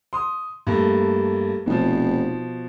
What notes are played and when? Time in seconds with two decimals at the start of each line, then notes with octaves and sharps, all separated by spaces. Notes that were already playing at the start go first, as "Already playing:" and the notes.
0.13 C6 D#6
0.67 G2 A3 A#3
1.66 F1 B2 F3